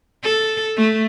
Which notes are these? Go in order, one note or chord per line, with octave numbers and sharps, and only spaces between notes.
A4
A3